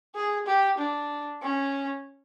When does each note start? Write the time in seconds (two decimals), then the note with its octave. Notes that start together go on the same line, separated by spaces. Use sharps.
0.15 G#4
0.46 G4
0.78 D4
1.42 C#4